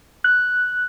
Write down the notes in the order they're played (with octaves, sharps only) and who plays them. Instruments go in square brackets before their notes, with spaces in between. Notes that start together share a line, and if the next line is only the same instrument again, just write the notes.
[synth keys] F#6